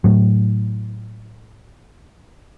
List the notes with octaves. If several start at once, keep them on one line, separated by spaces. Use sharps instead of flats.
A2 F#3